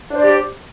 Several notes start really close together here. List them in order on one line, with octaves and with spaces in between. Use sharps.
D4 C5 D5 G4